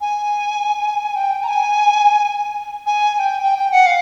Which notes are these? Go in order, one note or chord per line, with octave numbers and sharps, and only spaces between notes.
G#5
G5
A#5
G#5
G#5
G#5
G5
G5
G5
F#5
F5